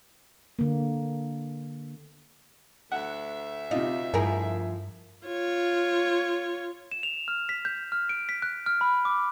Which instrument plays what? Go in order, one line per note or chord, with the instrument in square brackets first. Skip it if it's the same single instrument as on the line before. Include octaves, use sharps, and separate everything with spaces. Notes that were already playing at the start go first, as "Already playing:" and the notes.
[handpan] D3 A#3
[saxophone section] D2 E5 [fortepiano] F#5
[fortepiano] C3 D#4 [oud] F4
[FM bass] G2 [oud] F3 E4 A#4 [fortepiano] G#4
[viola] F4 C#5
[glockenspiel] E7
F7
F6
B6
G6
F6
D7
B6
F#6
F6
B5
D6